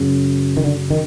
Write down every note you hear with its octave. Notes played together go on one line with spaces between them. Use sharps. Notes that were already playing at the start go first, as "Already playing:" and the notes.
Already playing: F#2 C#3
D#3
D3
D#3